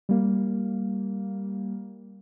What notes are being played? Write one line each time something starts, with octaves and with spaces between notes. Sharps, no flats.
G3 A#3